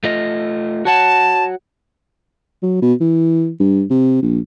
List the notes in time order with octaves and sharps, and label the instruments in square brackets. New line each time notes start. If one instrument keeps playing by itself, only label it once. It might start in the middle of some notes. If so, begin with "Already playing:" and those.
[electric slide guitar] A3 F4 D#5
[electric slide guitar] F#4 C#5 F#5 [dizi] A5
[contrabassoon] F#3
B2
E3
G2
C3
A#1